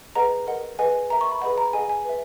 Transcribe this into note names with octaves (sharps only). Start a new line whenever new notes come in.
G#4 B4 D#5 F#5 A#5
A#4 D#5 F#5
G#4 B4 D#5 F#5 G#5
A#4 E5 A#5
C#6
B5
G#4 B4 D#5 F#5 B5
A#5
G#4 D#5 F#5 G#5
G#5
B4 E5